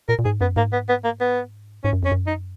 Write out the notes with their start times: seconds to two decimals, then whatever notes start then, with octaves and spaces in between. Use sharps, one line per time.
0.09 A#2 A#4
0.19 A#2
0.25 G#2 G#4
0.41 F#2 B3
0.56 G#2 A#3
0.73 B3
0.89 B3
1.04 A#3
1.21 B3
1.84 G#2 C#4
1.93 F#2
2.03 F2 C#4
2.12 F#2
2.27 D#4